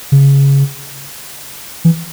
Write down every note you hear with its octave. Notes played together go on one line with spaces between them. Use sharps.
C#3
E3